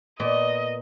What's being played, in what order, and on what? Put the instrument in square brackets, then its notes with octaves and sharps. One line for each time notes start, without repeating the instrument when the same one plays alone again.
[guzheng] A#2 B3 D5 [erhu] D#5